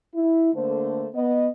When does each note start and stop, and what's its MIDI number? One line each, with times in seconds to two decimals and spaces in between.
0.14 0.53 64
0.54 1.07 50
0.54 1.07 57
0.54 1.07 58
0.54 1.07 72
1.14 1.48 59
1.14 1.48 75